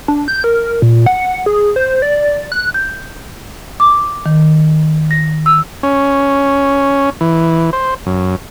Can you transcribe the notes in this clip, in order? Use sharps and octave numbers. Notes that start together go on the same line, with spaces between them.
D4
G6
A#4
A#2
F#5
G#4
C5
D5
F#6
G6
D6
D#3
A#6
E6
C#4
E3
C5
F#2